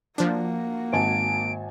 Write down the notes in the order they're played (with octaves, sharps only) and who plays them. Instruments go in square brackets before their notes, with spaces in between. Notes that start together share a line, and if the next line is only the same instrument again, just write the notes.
[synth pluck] F3 D4 [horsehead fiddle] A#3 F#4
[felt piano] G#1 G#5 A5 [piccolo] D7